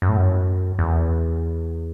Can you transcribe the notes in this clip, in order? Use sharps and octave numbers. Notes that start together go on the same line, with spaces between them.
F#2
A2
F#2
E2